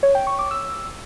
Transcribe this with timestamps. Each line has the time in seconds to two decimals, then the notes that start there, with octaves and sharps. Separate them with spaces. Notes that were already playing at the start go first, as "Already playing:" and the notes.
0.03 C#5
0.15 G5
0.27 C#6
0.39 D6
0.51 E6